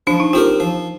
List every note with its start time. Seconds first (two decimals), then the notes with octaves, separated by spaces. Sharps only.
0.07 F3 D4
0.20 D#4
0.33 C4 F4 G4 A#4
0.60 F3